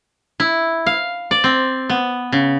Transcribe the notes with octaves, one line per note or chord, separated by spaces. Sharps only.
E4
F5
D5
C4
B3
C#3